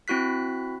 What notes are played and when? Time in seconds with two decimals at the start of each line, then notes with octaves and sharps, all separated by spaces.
0.08 C4 E4 F#4 F#6 B6